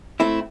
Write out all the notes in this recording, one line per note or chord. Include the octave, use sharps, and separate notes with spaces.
A3 C4 E4